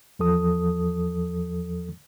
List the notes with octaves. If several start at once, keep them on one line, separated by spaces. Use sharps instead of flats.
E2 F3 A4 D#6